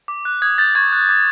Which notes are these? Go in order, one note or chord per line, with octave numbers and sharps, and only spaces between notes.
D6
F#6
D#6 G#6
G6 A6
C#6 G#6
F#6
D6